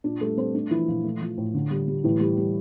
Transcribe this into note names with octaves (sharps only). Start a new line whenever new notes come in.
A#2 D4
G3 A3 A4
G3 C4 C5
A3 D4
E3 F3 E4
A#2 F3 F4
A3
F3
A2
D3
G3
G3
A2 E3 E4
G3
G3